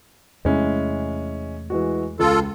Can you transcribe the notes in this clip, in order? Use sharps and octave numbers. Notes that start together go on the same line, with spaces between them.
E2 C3 G#3 A3 C#4 E4
E3 G#3 F#4
C#2 F4 A4